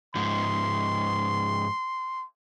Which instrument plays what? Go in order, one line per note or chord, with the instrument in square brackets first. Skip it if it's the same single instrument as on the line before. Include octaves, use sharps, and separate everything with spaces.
[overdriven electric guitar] G#2 F3 [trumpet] C6